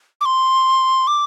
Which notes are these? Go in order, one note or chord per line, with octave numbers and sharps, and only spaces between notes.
D6
C6
D6